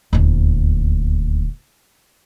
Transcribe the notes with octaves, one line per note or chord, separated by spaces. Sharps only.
D#1 D2